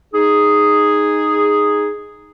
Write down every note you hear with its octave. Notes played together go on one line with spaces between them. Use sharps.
D#4 G#4